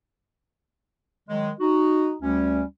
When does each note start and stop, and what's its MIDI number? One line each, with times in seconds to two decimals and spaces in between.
1.29 1.50 51
1.29 1.50 54
1.29 1.50 56
1.60 2.14 63
1.60 2.14 66
2.22 2.63 38
2.22 2.63 55
2.22 2.63 61